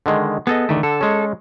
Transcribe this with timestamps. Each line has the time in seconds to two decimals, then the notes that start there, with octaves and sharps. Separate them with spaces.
0.06 D3 D#3 G#3
0.47 B3 G#4 A4 D#5
0.69 D3 D#3 A3
0.83 D3 A4
1.01 G#3 C#4